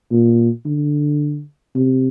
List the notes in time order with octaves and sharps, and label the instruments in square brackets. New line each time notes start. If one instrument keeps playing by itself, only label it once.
[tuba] A#2
D3
C3